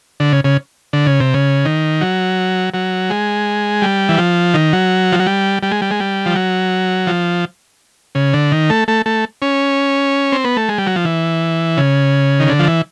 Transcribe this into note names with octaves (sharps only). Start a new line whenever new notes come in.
D3
C#3
C#3
D3
C#3
C3
C#3
D#3
F#3
F#3
G#3
G3
E3
F3
D#3
F#3
F3
F#3
G3
G3
G#3
G3
G#3
G3
F3
F#3
F3
C#3
D3
D#3
A3
A3
A3
C#4
C4
B3
A3
G#3
G3
F#3
F3
E3
C#3
D#3
D3
F3
E3